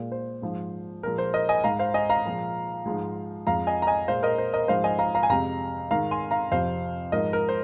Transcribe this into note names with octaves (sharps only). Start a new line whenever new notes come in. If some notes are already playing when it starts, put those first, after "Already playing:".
Already playing: A#2 G#3
C5
G#2 F3 G#3
A#2 F3 G#3 A#4
C5
A#4 D#5
D#5 G#5
G#2 G#3 F5 A#5
C5 F5
D#5 G#5
F5 A#5
A#2 F3 G#3
G#2 F3 G#3
F2 F3 G#3 F5 A#5
D#5 G#5
A#5
D#5 G#5
A#2 G#3 C5 F5
A#4 D#5
C5
A#4 D#5
G#2 F3 G#3 C5 F5
D#5 G#5
F5 A#5
F5 A#5
G#5
F2 C3 G#3 F5 A#5
G#2 D#3 G#3 F5 A#5
G#5 C6
F5 A#5
F2 C3 F3 C5 F5
G#2 F3 G#3 A#4 D#5
A#4
C5